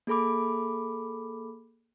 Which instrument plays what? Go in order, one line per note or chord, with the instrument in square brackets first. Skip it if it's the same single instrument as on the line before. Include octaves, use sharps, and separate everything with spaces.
[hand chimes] A#3 G#4 A4 B5 D6